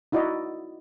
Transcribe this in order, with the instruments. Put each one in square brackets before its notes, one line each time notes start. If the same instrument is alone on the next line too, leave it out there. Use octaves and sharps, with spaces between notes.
[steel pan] D#4 E4 F#4 D5 D#5